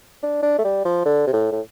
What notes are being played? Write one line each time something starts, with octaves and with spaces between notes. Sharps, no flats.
D4
D4
A3
G3
F3
D3
C3
A2
A2